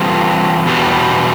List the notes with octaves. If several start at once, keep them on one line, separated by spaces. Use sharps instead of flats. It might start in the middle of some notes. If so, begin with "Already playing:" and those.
Already playing: E3 G3 C4 F4 A4
E2 B2 G3